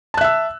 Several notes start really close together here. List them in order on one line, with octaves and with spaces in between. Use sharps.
A5 F#6 E5 E6